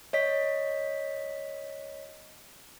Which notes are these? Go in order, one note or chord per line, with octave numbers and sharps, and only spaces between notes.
C#5 D#5 B6